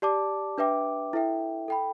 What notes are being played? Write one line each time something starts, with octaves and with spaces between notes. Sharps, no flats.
G4 D5 A5 D6
D4 B4 E5 G5 D6
E4 A4 E5 G5
A4 G5 B5